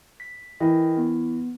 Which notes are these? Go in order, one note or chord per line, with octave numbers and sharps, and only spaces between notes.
B6
E3 A#4 D#5 G5
B3